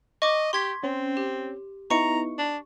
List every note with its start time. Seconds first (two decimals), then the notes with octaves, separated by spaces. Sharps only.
0.22 D#5 C#6 D6
0.53 G4 C6 G#6 B6
0.83 C4 C#4
1.17 G4
1.91 B3 D#4 E4 A#5 C#6 C#7
2.38 D4